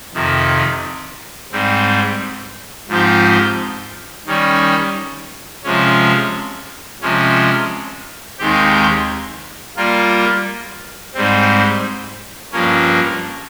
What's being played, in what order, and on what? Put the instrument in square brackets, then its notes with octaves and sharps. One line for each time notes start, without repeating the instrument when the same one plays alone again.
[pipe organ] F2 C3 D#3
G#2 G3 C4
G#2 F3 C4 D#4 G4
D#3 G3 C#4
C3 F3 G#3 C#4
C3 F3 G#3 C#4
D#2 D#3 G#3 C4 G4
G3 A#3 F4
G#2 G3 C4
G2 F3 A#3 C#4